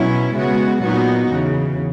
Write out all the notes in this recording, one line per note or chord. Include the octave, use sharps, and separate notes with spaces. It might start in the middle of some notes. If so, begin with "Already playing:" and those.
Already playing: B2 F#3 C#4 E4
C#3 G#3 B3 F#4
A#2 F#3 B3 D#4 F#4
E2 C#3 E3